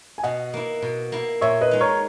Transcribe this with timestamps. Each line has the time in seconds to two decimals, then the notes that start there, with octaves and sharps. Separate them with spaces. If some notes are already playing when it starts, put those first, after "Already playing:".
0.18 G#5
0.23 B2 D#5 F#5
0.53 A#3 E4
0.82 B2
1.12 A#3 E4
1.41 A#2 C#5 E5
1.61 B4 D#5
1.71 G#3 D#4
1.81 A#4 C#5